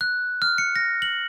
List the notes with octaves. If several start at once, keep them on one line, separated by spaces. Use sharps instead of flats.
F#6
F6
C#7
A#6
F#7